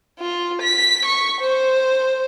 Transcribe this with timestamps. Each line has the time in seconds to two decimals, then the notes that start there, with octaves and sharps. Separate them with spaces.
0.19 F4
0.62 B6
1.06 C#6
1.41 C5